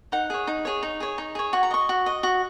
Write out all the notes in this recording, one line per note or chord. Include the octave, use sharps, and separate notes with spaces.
D#4 F#5
G#4 C#5
D#4
G#4 C#5
D#4
G#4 C#5
D#4
G#4 C#5
F#4 C#6
A#5
D#5 C#6
F#4
D#5
F#4